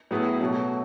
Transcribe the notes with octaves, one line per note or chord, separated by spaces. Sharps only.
A2 F#3 B3 E4 G#4
B2 F#3 A3 C#4